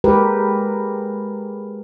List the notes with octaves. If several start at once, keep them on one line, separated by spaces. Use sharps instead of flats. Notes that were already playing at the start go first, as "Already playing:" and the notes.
G#3 G4 A#4 B4